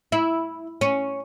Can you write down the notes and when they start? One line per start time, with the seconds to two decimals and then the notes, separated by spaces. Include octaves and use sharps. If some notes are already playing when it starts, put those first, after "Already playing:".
0.12 E4
0.81 C#4